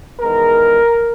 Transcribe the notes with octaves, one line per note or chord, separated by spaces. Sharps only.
E2 D#3 G#3 B3 A#4